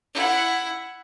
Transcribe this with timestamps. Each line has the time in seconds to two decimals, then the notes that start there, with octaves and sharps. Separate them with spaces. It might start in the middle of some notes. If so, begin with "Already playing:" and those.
0.14 E4 F#5